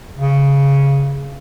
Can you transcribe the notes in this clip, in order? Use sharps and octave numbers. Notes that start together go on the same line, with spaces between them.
C#3